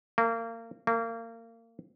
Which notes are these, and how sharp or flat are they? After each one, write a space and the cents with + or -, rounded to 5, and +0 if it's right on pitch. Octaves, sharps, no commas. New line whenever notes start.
A#3 -30
A#3 -30